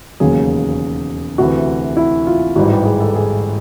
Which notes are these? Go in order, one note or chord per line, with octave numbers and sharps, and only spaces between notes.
E1 D#2 C#3 F#3 G#4
D2 C3 E3 F#4
E4
F4
A1 G#2 E3 G3 F#4
G4
G#4
A4
G#4